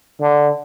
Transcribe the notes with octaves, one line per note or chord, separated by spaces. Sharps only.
D3